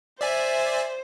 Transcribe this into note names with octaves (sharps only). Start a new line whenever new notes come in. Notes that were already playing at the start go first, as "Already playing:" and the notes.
C5 D5 E5 G#5